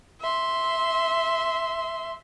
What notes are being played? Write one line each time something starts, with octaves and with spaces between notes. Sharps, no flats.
E5 C6